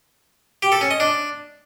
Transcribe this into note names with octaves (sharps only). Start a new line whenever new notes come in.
G4
A4
C#4
D#5
D4